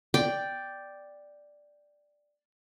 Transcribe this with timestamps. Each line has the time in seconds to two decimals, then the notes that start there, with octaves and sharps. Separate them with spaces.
0.14 D5 G5